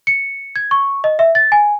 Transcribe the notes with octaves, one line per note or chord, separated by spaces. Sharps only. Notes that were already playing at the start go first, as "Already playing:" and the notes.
C#7
G#6
C#6
D#5
E5
A6
G#5